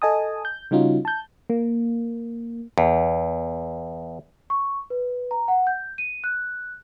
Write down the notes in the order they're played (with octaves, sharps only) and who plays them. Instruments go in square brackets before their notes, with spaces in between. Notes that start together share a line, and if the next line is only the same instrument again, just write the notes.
[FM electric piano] A4 D#5 G#5 A5 D#6
G6
C#3 G3 C#4 D#4 F4 F#4
A5 G6
A#3
[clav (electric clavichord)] E2
[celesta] C#6
B4
A#5
F#5
G6
D#7
F#6